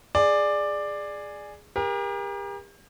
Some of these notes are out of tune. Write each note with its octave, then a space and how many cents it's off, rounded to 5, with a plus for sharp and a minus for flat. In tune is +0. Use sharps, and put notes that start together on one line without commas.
G#4 +0 D5 +10
G4 +40 A#4 +30